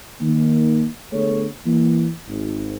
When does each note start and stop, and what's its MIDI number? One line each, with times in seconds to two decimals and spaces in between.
0.22 0.85 51
0.22 0.85 58
1.13 1.46 50
1.13 1.46 57
1.13 1.46 59
1.13 1.46 68
1.13 1.46 69
1.13 1.46 73
1.66 2.09 52
1.66 2.09 58
2.28 2.76 32